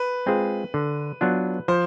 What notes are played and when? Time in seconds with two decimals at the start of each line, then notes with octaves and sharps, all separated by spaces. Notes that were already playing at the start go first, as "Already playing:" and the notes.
Already playing: B4
0.26 G#3 C4 F4 G#4
0.74 D3
1.21 F#3 B3 D4 F4
1.68 F3 C5